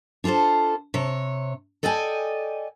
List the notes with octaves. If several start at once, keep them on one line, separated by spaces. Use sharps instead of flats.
D4 F4 G#4 A4 C5
C3 C#5
A4 D5 D#5 G5 G#5